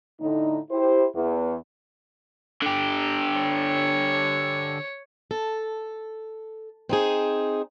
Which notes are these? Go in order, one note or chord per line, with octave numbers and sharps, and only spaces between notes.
A2 D3 D#4
E4 G4 C5
E2
D3 G4
C#5
A4
C4 D#4 G#4